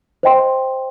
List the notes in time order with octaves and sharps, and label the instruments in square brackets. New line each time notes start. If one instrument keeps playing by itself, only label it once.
[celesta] C5 D#5 G5 C6